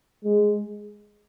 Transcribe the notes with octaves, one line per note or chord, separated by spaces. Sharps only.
G#3